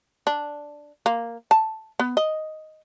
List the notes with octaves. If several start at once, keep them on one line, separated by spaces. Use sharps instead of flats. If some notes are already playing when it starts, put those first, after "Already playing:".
D4
A#3
A5
B3
D#5